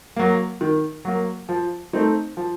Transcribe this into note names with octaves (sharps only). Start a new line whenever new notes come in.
F#3 A#3
D#3
F#3 A#3
F3
A3 C4 D#4
F3